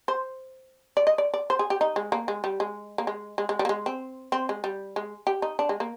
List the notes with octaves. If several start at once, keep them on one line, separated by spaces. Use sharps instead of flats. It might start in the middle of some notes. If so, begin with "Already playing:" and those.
C5
D5
D#5
D5
D5
C5
G#4
G4
D#4
G#3
A#3
G#3
G3
G#3
A#3
G#3
G#3
G#3
G3
A#3
G#3
C4
C4
G#3
G3
G#3
G4
D#4
D4
G#3
A#3